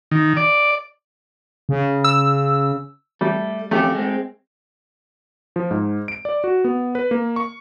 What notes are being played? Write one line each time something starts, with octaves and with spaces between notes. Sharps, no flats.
D#3
D5
C#3
E6
G3 A3
F2 A3 C#4 G4
G#3 C4
F3
G#2
D7
D5
F#4
B3
B4
A#3
C#6